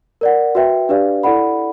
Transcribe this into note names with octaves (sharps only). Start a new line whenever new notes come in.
A#4 D5 F#5
F#4 B4 E5 G5
D4 G4 B4 D5 F5
E4 A4 D5 F#5 B5